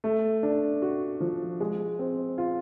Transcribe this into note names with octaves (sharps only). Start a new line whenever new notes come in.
A3
D4
F#4
F3
G#3
C4
F4